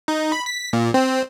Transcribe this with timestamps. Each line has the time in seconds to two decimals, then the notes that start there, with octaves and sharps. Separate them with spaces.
0.08 D#4
0.32 B5
0.46 B6
0.73 A#2
0.94 C4